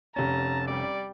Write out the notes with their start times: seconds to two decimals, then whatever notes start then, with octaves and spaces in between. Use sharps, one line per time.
0.16 F1 C#4 A5 A#5
0.68 G3 D5